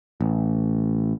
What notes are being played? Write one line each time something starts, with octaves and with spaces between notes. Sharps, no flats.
A1